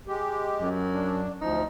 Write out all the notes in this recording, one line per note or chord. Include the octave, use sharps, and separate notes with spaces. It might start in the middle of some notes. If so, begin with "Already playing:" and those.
G#3 G4
F#2
D4
D2 F3 D#4